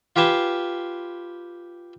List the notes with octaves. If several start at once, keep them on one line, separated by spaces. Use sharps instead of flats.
F4 G4 B4 G#5 A5 C6